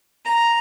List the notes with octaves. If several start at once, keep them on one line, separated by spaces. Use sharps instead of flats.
A#5